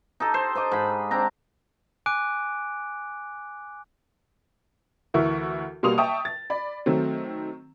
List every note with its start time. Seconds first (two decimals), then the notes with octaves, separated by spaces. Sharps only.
0.20 D#4 G4 A4
0.34 C5
0.55 C5 D#5 D6
0.71 G#2 B5
1.11 C4 D4 A#5
2.06 G#5 D6 F#6 D7
5.14 D2 E3 E4 F#4 A#4 C#6
5.83 B2 G3 A#3 C6 D#6 F7
5.98 E5 G5 A5 C#6 D#6
6.25 A6
6.50 D5 B5
6.86 D#3 F#3 A3 C4